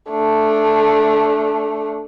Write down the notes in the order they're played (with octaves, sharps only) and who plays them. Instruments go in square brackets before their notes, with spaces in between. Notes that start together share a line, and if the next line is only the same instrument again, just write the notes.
[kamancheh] A3 D4